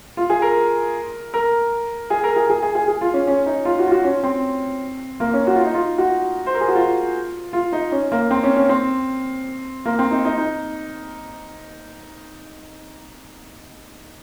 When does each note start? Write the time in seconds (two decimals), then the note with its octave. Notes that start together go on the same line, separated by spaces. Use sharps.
0.17 F4
0.30 G#4
0.42 A#4
1.34 A#4
2.10 G#4
2.24 A#4
2.36 G#4
2.50 G#4
2.63 G#4
2.75 G#4
2.88 G#4
3.01 F4
3.14 C#4
3.27 C#4
3.46 D#4
3.65 F4
3.79 F#4
3.87 F4
3.92 F#4
4.04 C#4
4.23 C4
5.20 A#3
5.34 C#4
5.47 F#4
5.56 F4
5.65 D#4
5.74 F4
5.98 F#4
6.46 C5
6.54 A#4
6.61 G#4
6.68 F#4
6.75 F4
7.53 F4
7.72 D#4
7.92 C#4
8.12 A#3
8.31 C4
8.43 C#4
8.56 C#4
8.69 C4
9.85 A#3
9.99 C4
10.11 D#4
10.25 D#4
10.38 D#4